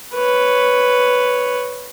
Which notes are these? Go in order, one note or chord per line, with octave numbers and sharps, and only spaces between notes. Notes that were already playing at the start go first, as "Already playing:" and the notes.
B4 C#5